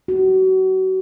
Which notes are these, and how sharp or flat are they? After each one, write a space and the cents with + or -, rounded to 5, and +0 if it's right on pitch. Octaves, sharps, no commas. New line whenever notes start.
F#4 +30